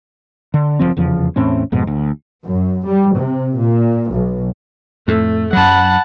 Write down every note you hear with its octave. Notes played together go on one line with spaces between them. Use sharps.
D3
F#1 F#2 F3 C4
F1 E2 C#3 F3
E2 A2 C4 C#4
F2 G#2 B2
D2
F#2
G3
C3
A#2
B1
F2 A2 A3
F#2 F#3 F#5 A5 B5